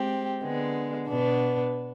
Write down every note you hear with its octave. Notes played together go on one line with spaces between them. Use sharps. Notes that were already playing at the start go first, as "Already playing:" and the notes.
Already playing: G#3 C4 G4
D3 G#3 B3
B2 B3 D4